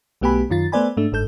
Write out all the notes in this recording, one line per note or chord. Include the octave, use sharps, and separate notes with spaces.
B1 A3 B3 G4 G#5 B5
F#2 D#3 F4 A6
A3 B3 C5 D5 G#5 B5
G#2 A3 D4
G1 G#2 A4 G6